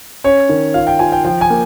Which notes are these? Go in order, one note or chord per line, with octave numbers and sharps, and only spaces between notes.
C#4 C#5
D#3
F4 F5
G5
F4 G#5
G5
F3 G5
G#5
A#3